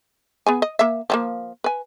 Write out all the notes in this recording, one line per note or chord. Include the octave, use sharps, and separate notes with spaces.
B3 G#4 G#5
D#5
A#3 E5
F3 F#3 A#3
B4 G#5